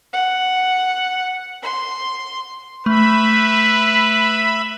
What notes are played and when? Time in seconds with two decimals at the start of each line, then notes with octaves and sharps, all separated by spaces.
0.13 F#5
1.63 C6
2.86 A3 B4 E5 B5